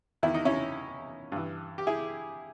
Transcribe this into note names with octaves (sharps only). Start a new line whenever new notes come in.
E2 D#3 E4
D#4
C#4 E4
G2 E3
G4
E4 G#4